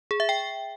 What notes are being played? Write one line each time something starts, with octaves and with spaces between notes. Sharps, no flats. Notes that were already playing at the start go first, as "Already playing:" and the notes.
G#4
E5
G5